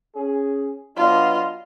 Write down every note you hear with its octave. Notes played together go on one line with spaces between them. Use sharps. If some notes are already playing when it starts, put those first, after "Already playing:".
C#4 G#4
F#3 B3 D4 F4 D#5